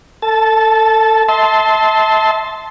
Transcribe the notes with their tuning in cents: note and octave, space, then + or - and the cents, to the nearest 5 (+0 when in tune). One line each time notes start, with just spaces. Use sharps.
A4 +25 A5 -15
E5 -35 A5 +0 C6 +0